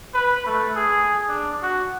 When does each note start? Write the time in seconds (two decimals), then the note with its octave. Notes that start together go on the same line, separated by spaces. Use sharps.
0.14 B4
0.46 A3
0.76 G#4
1.28 D4
1.62 F#4